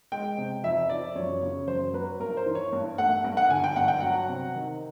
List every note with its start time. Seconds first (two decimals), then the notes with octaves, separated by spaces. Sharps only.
0.12 G#3 G5
0.38 C3
0.64 F2 E5
0.90 F3 D5
1.16 F#2 C#5
1.42 C#3 C#5
1.68 F#2 C5
1.94 F#3 B4
2.20 G2 A#4
2.37 C5
2.46 E3
2.55 C#5
2.73 G2
2.98 A3 F#5
3.24 G2
3.37 F#5
3.50 D3 G#5
3.64 G5
3.76 G2 F#5
3.88 G5
4.00 F#3 F#5
4.28 C3
4.55 D#3